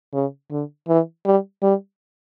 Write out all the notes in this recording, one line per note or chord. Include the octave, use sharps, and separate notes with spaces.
C#3
D3
E3
G3
G3